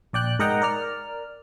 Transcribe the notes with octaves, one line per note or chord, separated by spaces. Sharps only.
A#1 D5 G5 F#6
G#2 A#4 D#5 F#5 G5 A#5
A#4 D5 F6